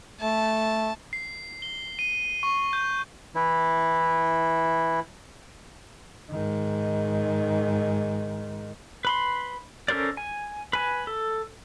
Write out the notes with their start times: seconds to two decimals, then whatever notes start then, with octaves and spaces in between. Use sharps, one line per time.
0.21 A3 A5
1.13 C7
1.62 G7
1.99 D#7
2.43 C#6
2.73 G6
3.35 E3 E4
6.31 G#2 D#3
9.05 B4 B5 C6
9.88 C#4 A4 A#4 C5 D5
10.17 G#5
10.73 B4 G#5
11.07 A4